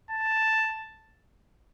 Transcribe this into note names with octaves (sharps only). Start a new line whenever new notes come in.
A5